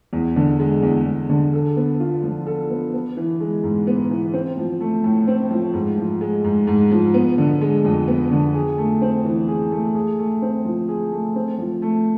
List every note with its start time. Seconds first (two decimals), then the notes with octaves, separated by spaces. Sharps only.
0.13 E2
0.36 D3
0.60 G#3
0.83 E2
1.06 E2
1.30 D3
1.53 A4
1.76 B3
2.00 F4
2.23 F3
2.47 A4
2.70 B3
2.93 B3
3.17 E3
3.40 G#3
3.63 G#2
3.87 B3
4.10 E3
4.34 C4
4.57 F3
4.80 A3
5.04 A2
5.28 C4
5.51 F3
5.74 G#2
5.98 F3
6.21 G#3
6.44 G#2
6.67 G#2
6.91 F3
7.14 B3
7.38 D3
7.61 G#3
7.85 F2
8.08 B3
8.31 D3
8.55 G#4
8.78 A3
9.02 C4
9.25 E3
9.48 G#4
9.72 A3
9.95 G#4
10.19 A3
10.42 C4
10.65 F3
10.89 G#4
11.12 A3
11.36 C4
11.58 F3
11.82 A3